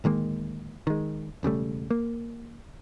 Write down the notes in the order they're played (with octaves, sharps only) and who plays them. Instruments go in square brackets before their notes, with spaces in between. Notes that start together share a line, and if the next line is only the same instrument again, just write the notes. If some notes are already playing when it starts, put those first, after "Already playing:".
[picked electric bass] D1 D#3 G#3 A#3
D#3 G#3
E1 C#3 G3 A3
A#3